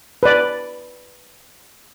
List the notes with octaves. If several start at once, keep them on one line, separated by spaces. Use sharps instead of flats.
B4 D5